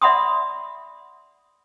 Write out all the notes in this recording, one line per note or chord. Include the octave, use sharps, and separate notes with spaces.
D5 E5 F#5 B5 C6 D#6